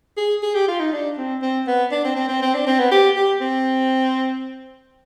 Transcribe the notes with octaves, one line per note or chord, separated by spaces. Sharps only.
G#4
G#4
G4
F4
D#4
D4
C4
C4
B3
D4
C4
C4
C4
C4
D4
C4
B3
G4
G4
C4